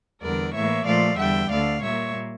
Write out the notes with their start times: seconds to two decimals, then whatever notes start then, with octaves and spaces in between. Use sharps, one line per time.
0.21 E2 D3 G3 A#4 D5
0.53 A2 E3 A#3 C#5 E5
0.85 A#2 F3 A3 D5 F5
1.18 E2 D3 G3 E5 G5
1.51 D2 D3 A3 D5 F5
1.82 A#2 G3 A#3 C#5 E5